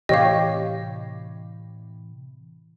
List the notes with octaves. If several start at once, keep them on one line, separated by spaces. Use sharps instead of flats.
A2 C3 E3 G4 C#5 D#5 F5